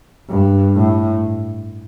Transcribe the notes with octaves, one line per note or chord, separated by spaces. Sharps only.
G2
A2